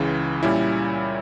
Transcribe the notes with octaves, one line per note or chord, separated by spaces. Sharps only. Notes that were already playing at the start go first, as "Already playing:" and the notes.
Already playing: C#2 C#3 E3
A#2 G3 C#4 E4